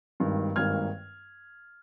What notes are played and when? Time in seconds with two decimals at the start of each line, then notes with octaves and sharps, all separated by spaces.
0.20 G#1 G2 D#3 A#3
0.56 G#1 G2 D#3 A#3 F6 G#6